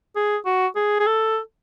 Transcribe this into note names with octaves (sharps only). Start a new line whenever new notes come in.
G#4
F#4
G#4
G#4
A4